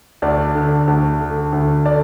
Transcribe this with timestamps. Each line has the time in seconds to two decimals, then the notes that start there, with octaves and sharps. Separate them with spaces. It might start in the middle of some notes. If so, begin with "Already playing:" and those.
0.22 D2 D5
0.55 D3
0.88 D2
1.20 D3
1.53 D2
1.85 D3 D5